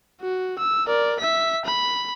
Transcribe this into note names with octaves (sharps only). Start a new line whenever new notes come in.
F#4
E6
A#4 D5
E5 B6
B5